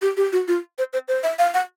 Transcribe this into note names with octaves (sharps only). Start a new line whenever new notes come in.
G4
G4
F#4
F4
C5
C5
C5
E5
F5
F#5